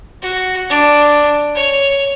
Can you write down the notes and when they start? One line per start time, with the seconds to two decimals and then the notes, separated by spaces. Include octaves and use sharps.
0.22 F#4
0.70 D4
1.55 C#5